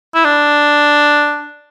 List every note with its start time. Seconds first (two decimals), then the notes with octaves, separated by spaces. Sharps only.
0.15 E4
0.25 D4